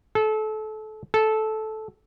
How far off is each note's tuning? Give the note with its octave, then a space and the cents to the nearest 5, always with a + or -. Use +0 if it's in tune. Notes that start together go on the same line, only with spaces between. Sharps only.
A4 -25
A4 -10